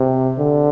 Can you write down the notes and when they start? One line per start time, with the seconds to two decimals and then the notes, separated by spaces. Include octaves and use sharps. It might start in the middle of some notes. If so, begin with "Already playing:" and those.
Already playing: C3
0.39 D3